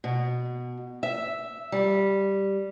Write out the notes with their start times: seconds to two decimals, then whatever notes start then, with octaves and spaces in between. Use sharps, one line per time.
0.04 B2
1.03 E5
1.72 G3